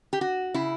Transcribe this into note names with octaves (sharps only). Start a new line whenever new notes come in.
G4
F#4
C#3 E4